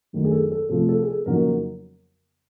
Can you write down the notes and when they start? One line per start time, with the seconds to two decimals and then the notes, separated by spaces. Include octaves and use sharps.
0.13 F#2 D#3 F#3 A3 D4
0.24 G#4
0.32 A4
0.52 A4
0.69 C3 F3 A3 A4
0.89 A4
1.03 G#4
1.07 A4
1.26 F2 C#3 F#3 A#3 D#4 A#4